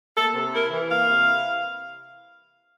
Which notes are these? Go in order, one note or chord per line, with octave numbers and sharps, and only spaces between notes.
A#3 A4
C3
E4 A#4
E3
A#3 F5
C3
E4